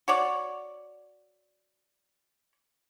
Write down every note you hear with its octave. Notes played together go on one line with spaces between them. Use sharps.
F#4 C#5 D5